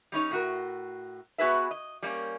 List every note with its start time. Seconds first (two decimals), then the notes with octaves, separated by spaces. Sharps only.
0.12 G3 C#4 D#4 C#5
0.31 A2 F#4 A#4
1.38 B3 F#4 G#4 B4 E5
1.71 D#5
2.02 G3 A#3 C#4